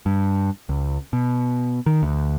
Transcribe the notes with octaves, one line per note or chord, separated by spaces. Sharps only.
G2
C#2
B2
D#3
D2